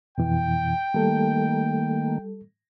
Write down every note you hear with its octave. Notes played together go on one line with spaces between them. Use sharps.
F2 B2 E3 G5
D#3 G3 A3 A#3 A4